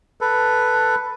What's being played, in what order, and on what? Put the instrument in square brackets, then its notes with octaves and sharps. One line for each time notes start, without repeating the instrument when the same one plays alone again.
[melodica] A4 B4